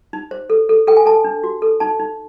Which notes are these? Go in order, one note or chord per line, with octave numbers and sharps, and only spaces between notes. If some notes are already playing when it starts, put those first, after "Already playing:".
D#4
C5
A4
A4
A4 G5
G#5
A4 A5
D4
F#4
A4
D#4 A5
D#4